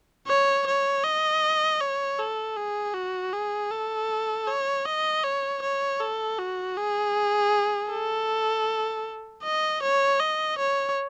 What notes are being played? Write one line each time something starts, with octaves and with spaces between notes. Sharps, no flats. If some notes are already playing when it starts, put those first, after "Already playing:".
C#5
C#5
D#5
C#5
A4
G#4
F#4
G#4
A4
C#5
D#5
C#5
C#5
A4
F#4
G#4
A4
D#5
C#5
D#5
C#5